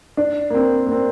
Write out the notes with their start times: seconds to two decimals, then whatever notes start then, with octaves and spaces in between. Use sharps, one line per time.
0.17 D4
0.50 A#3
0.54 C4
0.86 A#3
0.92 C4